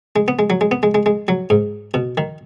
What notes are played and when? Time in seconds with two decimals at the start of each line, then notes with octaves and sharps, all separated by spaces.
0.16 G#3
0.28 B3
0.39 G#3
0.50 F#3
0.61 G#3
0.71 B3
0.83 G#3
0.94 G#3
1.06 G#3
1.28 F#3
1.50 G#2
1.94 B2
2.17 D#3